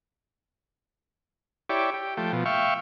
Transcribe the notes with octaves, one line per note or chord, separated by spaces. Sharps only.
E4 G4 C#5 D5
G4
F3 A3 G5
B2 F3
E5 F5 G5 C#6